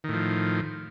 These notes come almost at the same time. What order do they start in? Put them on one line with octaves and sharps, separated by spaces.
D#3 A2 F3